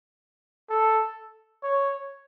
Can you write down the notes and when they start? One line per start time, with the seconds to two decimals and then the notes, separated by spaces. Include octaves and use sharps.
0.70 A4
1.63 C#5